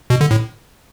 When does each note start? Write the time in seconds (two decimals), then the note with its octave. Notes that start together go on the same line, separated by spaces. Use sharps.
0.10 B2
0.21 D3
0.31 A2